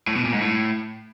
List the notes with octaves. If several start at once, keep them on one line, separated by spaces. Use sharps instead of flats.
A2
B2
A#2
G#2
A2